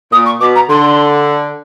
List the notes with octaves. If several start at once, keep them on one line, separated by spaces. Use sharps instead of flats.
A#2 D#6
C#6
B2 D6
A#5
D3 C6